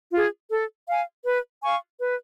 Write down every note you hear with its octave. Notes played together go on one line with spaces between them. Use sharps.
F4 G#4
A4
F5 G#5
B4
F5 G#5 C#6
B4